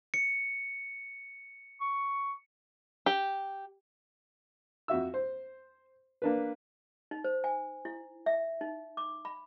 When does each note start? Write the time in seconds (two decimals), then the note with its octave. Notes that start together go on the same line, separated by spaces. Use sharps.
0.14 C#7
1.81 C#6
3.06 G4
4.88 F2 F#4 E5 E6
5.14 C5
6.22 A#3 D4 B4
7.11 D#4
7.24 C5
7.44 G#5
7.85 E4
8.26 E5
8.61 D#4
8.97 D6
9.25 B5